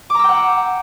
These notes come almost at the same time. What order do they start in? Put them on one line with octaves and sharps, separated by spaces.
D6 A#5 E6 G5 F#5